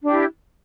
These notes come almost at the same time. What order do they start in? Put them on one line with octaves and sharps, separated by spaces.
D4 G4 E4